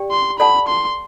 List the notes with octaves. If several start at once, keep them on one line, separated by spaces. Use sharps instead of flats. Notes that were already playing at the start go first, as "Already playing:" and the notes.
Already playing: G4 D5 G5
C6
A4 D5 F#5 A5 B5
C6